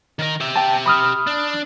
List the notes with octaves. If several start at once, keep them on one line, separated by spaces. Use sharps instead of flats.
D#3 A#4
G4 E5
G5 A5
B5 D#6 F6
D4